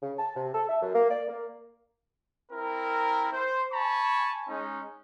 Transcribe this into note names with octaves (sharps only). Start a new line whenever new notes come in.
C#3
A5
C3
A4
E5
F#2
A#3
D5
A#3
C4 E4 A#4
C5
G#5 A5 B5 C#6
G#3 C#4 D#4